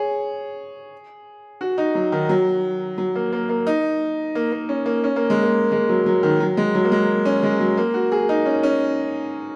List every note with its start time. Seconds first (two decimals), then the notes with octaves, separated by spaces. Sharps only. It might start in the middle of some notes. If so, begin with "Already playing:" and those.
Already playing: G#4 C#5
1.61 F#4
1.78 D#4
1.95 F#3
2.12 D#3
2.29 F#3
2.98 F#3
3.15 A#3
3.33 A#3
3.49 A#3
3.67 D#4
4.35 A#3
4.52 A#3
4.69 C#4
4.86 A#3
5.04 C#4
5.16 A#3
5.30 G#3
5.43 A#3
5.72 G#3
5.89 F#3
6.06 F#3
6.23 D#3
6.40 F#3
6.57 G#3
6.75 F#3
6.85 A#3
6.92 G#3
7.25 C#4
7.43 G#3
7.60 F#3
7.77 A#3
7.94 F#4
8.12 G#4
8.29 D#4
8.46 C#4
8.63 C#4